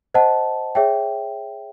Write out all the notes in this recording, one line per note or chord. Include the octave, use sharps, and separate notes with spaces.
C5 D#5 F#5 A5
G#4 C#5 E5 G5